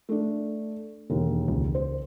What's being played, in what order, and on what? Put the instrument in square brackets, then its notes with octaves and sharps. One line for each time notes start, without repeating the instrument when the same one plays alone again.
[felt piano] A3 D4
E1 D#2
[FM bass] C#2
[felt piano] C5